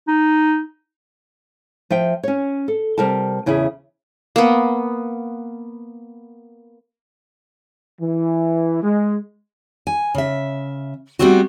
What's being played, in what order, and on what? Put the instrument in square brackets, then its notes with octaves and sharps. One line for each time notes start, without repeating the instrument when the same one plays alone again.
[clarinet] D#4
[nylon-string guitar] F3 E5 G5
C#4 C#5
A4
C3 G3 A#4 G5 A5
E2 C#3 E4 G#4 E5
[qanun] A#3 B3
[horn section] E3
G#3
[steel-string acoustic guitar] G#5
C#3 E5
G3 A3 B3 C4 F#4